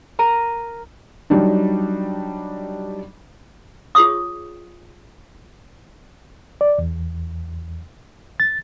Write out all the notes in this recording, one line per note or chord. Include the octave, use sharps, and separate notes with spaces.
A#4 A#5 D#7
F#3 G3 D4 D#4
F4 G#4 C#5 C#6 D#6
D5
E2
A6